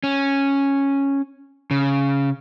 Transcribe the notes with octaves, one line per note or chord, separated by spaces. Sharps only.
C#4
C#3